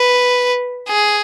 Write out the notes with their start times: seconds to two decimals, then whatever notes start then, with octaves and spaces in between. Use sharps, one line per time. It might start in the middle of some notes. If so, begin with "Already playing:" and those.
Already playing: B4
0.88 G#4